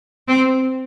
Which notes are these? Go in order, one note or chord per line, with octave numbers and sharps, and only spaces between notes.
C4